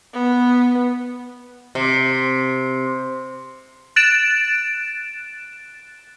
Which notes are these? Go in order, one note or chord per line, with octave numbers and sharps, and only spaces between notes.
B3
C3
F#6 A6 D7 E7